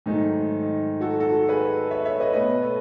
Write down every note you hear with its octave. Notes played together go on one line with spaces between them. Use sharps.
G#2 D#3 F#3 A3 D#4
D#4
F#4 A4
F#4 A4
G#4 B4
C#5 E5
C#5 E5
B4 D#5
B2 A3 B4 D#5
A4 C#5